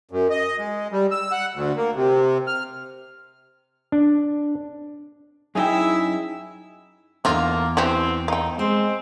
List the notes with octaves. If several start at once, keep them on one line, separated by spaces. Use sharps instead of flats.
F#2
D#5
G#3
G3
E6
F#5
D2
A#3
C3
F6
D4
F#2 D#4 E4 G#4 E5 G5
E2 D3 A#3 D#4 F4 A#5
E3 C4 F#4 G4
D#4 F5 G5
G#3 C4 C5